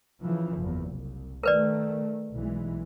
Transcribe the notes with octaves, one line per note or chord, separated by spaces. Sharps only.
C#3 E3 F3
F#1 E2
C2
D#3 A3 A#4 B4 D5
B1 E3 G#3